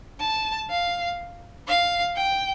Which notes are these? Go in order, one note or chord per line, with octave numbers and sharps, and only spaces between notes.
A5
F5
F5
G5